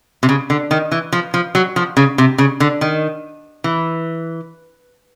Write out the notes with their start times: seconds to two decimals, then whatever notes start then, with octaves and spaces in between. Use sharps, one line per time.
0.23 C3
0.29 C#3
0.50 D3
0.71 D#3
0.92 E3
1.12 F3
1.34 F3
1.55 F#3
1.76 F3
1.97 C#3
2.18 C3
2.38 C#3
2.60 D3
2.81 D#3
3.64 E3